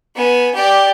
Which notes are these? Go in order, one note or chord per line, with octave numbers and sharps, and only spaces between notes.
B3 G#5
G4 D5